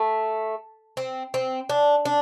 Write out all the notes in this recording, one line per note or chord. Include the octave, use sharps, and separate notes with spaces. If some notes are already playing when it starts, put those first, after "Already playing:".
Already playing: A3
C4
C4
D4
D4